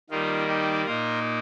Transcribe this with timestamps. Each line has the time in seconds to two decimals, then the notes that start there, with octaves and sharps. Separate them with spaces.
0.10 D#3 G3 A#3 D#4 F4
0.48 D#4 G4
0.85 A#2 A#3 D#4 F4 A#4